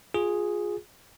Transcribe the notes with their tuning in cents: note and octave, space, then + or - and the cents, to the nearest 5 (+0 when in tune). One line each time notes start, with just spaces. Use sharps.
F4 +20 G#4 +0